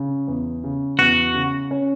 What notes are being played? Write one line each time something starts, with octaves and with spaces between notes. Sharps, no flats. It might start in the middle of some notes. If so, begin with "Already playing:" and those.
Already playing: C#3
E2
C#3
E2 F#4
C#3
C#4